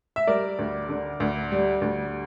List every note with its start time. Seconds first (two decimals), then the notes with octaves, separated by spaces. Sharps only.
0.16 E5
0.27 G3 A#4 D5
0.59 D2
0.89 D3
1.20 D2
1.52 G3
1.82 D2